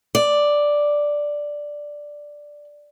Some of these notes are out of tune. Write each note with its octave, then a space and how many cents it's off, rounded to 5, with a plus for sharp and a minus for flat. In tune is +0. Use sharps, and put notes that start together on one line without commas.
D5 +0